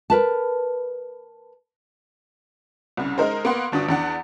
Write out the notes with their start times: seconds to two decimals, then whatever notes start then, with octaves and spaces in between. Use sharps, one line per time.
0.10 A#4 B4 A5
2.97 C2 C#3
3.18 G#3 D#4 A#4 C5
3.45 A#3 B3 F#5 C6
3.72 G1 D4 F#4 D#6
3.89 E2 D4 F#5